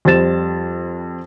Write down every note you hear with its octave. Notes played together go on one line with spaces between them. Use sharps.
F2 G3 C5 A6 E7